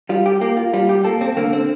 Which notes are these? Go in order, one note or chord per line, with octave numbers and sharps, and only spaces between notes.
G3 F4
G4
A#3 G4
F4
G3 F4
G4
A#3 A4
C4
D3 A#3
C4